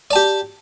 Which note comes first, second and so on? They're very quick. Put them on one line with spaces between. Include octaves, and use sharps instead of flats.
D5 A5 G4